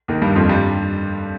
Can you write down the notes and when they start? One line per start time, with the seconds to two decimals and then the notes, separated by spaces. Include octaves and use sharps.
0.08 D#2 D#3
0.22 G2 G3
0.35 F2 F3
0.49 G2 G3